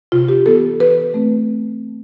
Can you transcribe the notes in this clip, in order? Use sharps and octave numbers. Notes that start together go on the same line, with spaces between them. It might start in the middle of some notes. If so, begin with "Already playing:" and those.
C3 F4
G4
E3 B3 A4
E3 B4
A3 C4